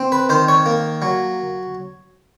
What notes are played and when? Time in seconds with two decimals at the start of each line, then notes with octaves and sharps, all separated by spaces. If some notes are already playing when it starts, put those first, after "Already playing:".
Already playing: C4
0.12 B4
0.29 D#3 C5
0.48 C#5
0.66 A#3
1.02 F#3